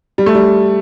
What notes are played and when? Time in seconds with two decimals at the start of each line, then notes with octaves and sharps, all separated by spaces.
0.18 G3
0.26 A3
0.35 G3